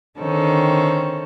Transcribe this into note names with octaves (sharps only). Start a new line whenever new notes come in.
D3 D#3 C4 C#4 A4